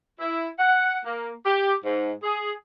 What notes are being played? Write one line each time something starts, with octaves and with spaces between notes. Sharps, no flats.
E4
F#5
A#3
G4
G#2
G#4